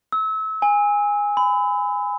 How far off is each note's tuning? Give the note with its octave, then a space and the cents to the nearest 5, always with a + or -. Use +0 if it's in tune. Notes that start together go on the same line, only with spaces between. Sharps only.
E6 -30
G#5 -15
B5 +30